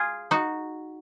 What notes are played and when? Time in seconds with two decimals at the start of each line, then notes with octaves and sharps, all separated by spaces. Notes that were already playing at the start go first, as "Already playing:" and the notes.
Already playing: F4 G#4
0.31 D#4 F#4